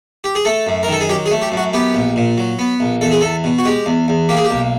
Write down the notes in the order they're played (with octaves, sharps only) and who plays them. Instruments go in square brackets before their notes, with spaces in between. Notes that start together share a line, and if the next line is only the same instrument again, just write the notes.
[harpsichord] G4
G#4
A3 A4
F#2
A#4
D#3 A4
G#4
F#3 G4
G#4
A3
G4
F#2
F#4
B3 G4
A#1
A#2
F#3
B3
A#1
E2 A4
G#4
E2 A4
B2
F#4
G#3 G4
E2
E2
A#3 G4
G#4
G4
B1